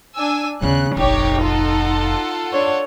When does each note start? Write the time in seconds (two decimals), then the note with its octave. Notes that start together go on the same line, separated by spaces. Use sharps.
0.14 D4 G#5 E6
0.62 D#2 C#3 B3 F#6
0.97 F1 A#1 D#4 G4 C#5
1.43 F4 A4 F#5
2.52 D4 C#5